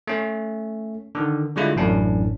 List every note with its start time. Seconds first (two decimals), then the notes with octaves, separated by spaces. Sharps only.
0.07 A3 C#4
1.15 D3 D#3
1.56 D3 G3 G#3 E4 F4
1.76 A1 F#2 A2 C#4 D4